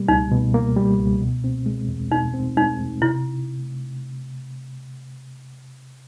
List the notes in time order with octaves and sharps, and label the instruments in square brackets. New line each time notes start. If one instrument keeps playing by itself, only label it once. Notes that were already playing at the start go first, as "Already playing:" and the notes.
Already playing: [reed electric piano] B2 G3 A#3
[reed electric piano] C#2 [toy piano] D#4
[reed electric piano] B2
A#3
G3
C#2
B2
C4
G#3
E2
[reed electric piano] B2 [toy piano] D#4
[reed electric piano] C4
[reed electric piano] G#3 [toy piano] D#4
[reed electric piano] E2
[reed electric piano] C3 [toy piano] E4